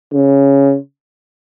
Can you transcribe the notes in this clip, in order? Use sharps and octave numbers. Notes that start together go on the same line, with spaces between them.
C#3